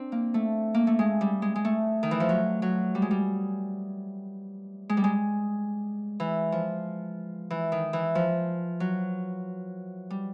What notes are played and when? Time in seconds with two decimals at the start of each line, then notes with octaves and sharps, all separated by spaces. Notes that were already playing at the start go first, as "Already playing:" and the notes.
Already playing: C4 D4
0.12 A#3
0.34 A3
0.74 A#3
0.87 A3
0.99 G#3
1.21 G3
1.42 G#3
1.56 G#3
1.65 A3
2.03 D#3
2.11 E3
2.20 F3
2.29 F#3
2.62 F#3
2.95 G3
3.02 G#3
3.11 G3
4.89 G#3
4.97 G3
5.04 G#3
6.20 E3
6.52 F3
7.50 E3
7.72 D#3
7.93 E3
8.15 F3
8.80 F#3
10.10 G3